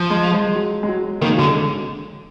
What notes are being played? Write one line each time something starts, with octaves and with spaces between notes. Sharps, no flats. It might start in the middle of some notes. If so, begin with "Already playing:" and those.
Already playing: F3
G#3
G#3
F#3
G#3
F#3
D#3 A#3
G#3
D3 F#3
G#3